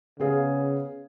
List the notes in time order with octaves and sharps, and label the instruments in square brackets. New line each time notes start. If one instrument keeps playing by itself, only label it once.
[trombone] C#3 [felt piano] B3 G#4 F5